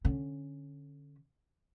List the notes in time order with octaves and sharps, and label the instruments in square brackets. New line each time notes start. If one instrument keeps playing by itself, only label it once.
[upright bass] D3 C#4